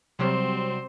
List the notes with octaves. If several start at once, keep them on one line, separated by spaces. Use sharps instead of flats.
C3 F#3 G3 C4 C5